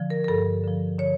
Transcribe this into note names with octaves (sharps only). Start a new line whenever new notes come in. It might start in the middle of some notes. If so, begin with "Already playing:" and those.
Already playing: D3 F3
A#4
A#4
G2 A4
D3 F3
D3 C#5